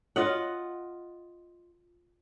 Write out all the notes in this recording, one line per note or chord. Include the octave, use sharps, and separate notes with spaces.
F4 D#5 F#5